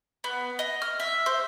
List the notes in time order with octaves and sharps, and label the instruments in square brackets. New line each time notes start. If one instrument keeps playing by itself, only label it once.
[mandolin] B3
D#5
F6
E5
C5